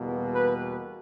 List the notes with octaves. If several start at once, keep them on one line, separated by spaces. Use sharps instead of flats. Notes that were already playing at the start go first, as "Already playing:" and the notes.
Already playing: E2 B2 G3 A#3
B4